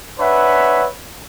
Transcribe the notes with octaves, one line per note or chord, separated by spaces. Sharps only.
D4 B4 C#5 E5 F#5